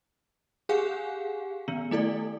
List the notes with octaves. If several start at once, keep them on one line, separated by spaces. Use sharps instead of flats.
G4 G#4 F5 F#5 G#5
D#3 B3
A3 E4 A4 D5